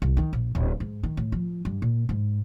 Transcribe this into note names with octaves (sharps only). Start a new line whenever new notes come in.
C2
D#3
A#1
D1
G#2
D#3
A2
F3
G2
A#2
G#2